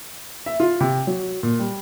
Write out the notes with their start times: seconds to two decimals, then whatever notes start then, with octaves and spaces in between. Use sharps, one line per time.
0.46 E5
0.60 F4
0.80 C3
1.07 F#3
1.43 A#2
1.59 G3